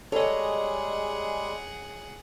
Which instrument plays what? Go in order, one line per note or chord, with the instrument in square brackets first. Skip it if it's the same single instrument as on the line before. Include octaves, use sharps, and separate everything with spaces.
[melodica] G3 G#3 [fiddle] G#4 F#5 [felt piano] A4 [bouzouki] C#5 D#5